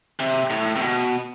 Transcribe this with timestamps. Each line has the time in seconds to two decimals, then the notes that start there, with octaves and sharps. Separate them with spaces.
0.20 C3
0.50 A2
0.76 C3
0.81 B2